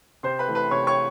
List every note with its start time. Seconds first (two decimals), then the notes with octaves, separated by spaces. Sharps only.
0.23 C3 C5 C6
0.39 B4 B5
0.48 E3 A3
0.55 B4 B5
0.71 C3 C#5 C#6
0.87 C#5 C#6